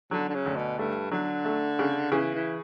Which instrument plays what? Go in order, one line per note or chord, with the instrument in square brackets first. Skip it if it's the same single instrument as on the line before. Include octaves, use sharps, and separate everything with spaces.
[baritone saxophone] D3 [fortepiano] F#3
[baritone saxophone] D3
C#3
[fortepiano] D2
[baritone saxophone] B2
[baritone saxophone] G2 [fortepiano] A3
[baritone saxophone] D3 [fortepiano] F#3
[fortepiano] A3
C#3
[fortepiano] C#3 [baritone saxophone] E3
[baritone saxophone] E3